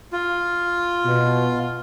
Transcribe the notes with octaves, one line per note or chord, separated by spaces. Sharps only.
F4
B2